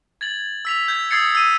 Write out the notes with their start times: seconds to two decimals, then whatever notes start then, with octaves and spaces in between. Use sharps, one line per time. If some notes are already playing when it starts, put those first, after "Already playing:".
0.21 G#6 A6 F#7
0.65 E6 B6 F7
0.88 G6 G#6
1.11 D#6 E6 G#6 A6 C7 C#7
1.35 E6 D#7